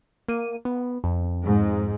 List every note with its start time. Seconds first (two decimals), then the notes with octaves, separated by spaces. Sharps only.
0.28 A#3 D#7
0.65 B3
1.04 F2
1.44 G#2